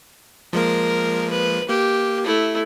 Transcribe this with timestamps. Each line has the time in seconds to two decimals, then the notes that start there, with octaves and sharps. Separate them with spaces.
0.53 F3 G#3 A#3 A#4
1.30 B4
1.69 A#3 G4
2.24 A3 E4